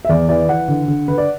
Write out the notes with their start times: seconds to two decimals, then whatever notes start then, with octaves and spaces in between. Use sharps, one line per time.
0.05 E5
0.09 E2 D5
0.29 E3 D5
0.49 E3 F#5
0.68 D3
0.88 D3
1.08 D3 B4
1.18 D5